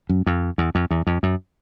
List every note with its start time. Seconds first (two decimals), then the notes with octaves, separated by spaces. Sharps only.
0.09 F#2
0.26 F2
0.58 E2
0.75 F2
0.91 E2
1.07 F2
1.23 F#2